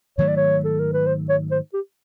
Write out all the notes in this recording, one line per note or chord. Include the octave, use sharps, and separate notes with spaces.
G#2 D#3 F#3 A3 C#5
D5
C#5
A4
A#4
B4
C5
C#5
C5
G4